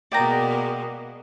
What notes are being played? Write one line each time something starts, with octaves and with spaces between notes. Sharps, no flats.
B2 G#3 A#3 D5 G5 A#5